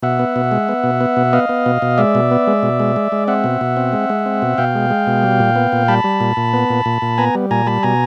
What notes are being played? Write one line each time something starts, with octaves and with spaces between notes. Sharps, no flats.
B2 E5 F#5
B3
B2
G#3
B3
B2
B3
B2
B3 D#5 F5
B3
B2
B2
G#3 D5 E5
B2
B3
G#3
B2
G#3
G#3
G#3
C4 E5 F#5
B2
B2
C4
G#3
G#3
C4
B2
B2 F5 G5
G#3
G#3
B2
G3
A#2
B3
A#2
G3 A5 B5
G3
A#2
A#2
B3
A#2
A#2
A#2
B3 G#5 A#5
G3
A#2 G#5 A#5
G3 A5 B5
B2 G#5 A#5